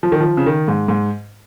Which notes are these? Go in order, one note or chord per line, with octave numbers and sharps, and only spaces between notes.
F3
D#3
F3
C#3
D#3
G#2
G#2